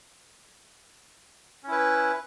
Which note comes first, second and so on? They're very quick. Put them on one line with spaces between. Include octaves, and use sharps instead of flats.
C#4 E4 B4